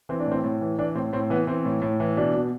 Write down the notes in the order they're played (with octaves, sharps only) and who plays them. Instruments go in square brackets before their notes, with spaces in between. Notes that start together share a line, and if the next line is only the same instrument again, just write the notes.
[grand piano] E3 C4
D4
A2
C4
A2
E3
E3 D4
A2 C4
A2 C4
E3 B3
E3 C4
A2
A2
E3
B2 D4
B2